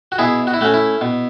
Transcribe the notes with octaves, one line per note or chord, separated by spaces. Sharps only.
F#4
B2 E4 G#4
F#4
E4
A3 C#4 F#4
E4
B2